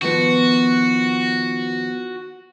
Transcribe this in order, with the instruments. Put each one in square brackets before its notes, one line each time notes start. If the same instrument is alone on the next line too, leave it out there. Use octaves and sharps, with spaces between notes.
[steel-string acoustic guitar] D#3 F3 B3 [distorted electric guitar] F#4